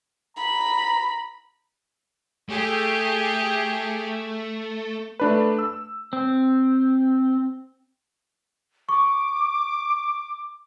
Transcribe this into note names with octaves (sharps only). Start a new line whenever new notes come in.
A#5 B5
A3 G4 G#4
A3 D4 B4
E6
C4
C#6 D6